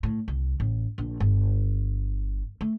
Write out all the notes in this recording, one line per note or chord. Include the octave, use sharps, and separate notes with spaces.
A2
C2
A1
A#1
G1
A3